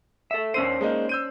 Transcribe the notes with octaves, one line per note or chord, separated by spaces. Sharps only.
A4 E5
D#2 C#4 D4 C5 E6 D#7
G#3 A#3 D#4
E6 G6 D#7